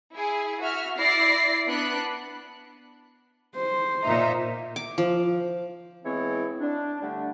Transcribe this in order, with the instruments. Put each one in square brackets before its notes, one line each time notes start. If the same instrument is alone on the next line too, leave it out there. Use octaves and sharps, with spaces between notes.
[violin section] E4 G#4
F#4 E5 F6
E4 D5 A#6 C7
B3 D4 B5 F#6
[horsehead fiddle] C5
[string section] A#2 D#4 [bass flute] E5
[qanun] D6
F3
[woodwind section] E3 G#3 B3 C4 E4 C#5
D4
D3 G3 A3 D4